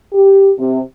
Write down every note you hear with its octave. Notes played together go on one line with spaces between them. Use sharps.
G4
C3